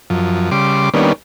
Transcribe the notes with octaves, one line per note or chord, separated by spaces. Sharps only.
F#2 F3
C#3 G3 C6 D6
D#3 G3 A#3 B3 C#4 D4